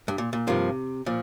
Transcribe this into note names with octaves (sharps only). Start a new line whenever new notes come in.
G2
A#2
A#2
G2 C3 F3 A#3 F4
A#2 F3